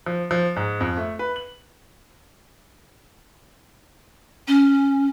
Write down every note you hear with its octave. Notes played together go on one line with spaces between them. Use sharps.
F3
F3
G#2
F2
A3
B4
F#7
C#4